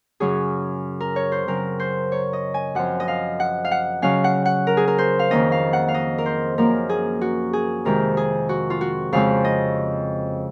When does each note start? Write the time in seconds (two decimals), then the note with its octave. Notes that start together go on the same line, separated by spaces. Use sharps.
0.20 F#2 C#3 F#3 C#4 G#4
1.00 A#4
1.16 C#5
1.32 C5
1.47 C#3 F#3 C4 A#4
1.80 C5
2.12 C#5
2.33 D#5
2.54 G#5
2.75 F#2 F3 C4 F#5
3.00 D#5
3.08 F5
3.40 F#5
3.65 F5
3.71 F#5
4.02 C#3 F#3 C#4 F5
4.24 F#5
4.45 F#5
4.67 A#4
4.77 G#4
4.88 A#4
4.98 C5
5.19 F5
5.30 F2 D#3 A#3 C#4 D#5
5.52 F5
5.73 F#5
5.88 F5
5.94 D#5
6.18 A#4
6.26 C5
6.58 F#2 F3 A#3 C#4 A#4
6.89 G#4
7.21 F#4
7.53 G#4
7.85 F2 C3 D#3 G#3 C4 A#4
8.17 G#4
8.49 F#4
8.70 F4
8.81 F#4
9.12 F2 C#3 G#3 C4 F5
9.45 D#5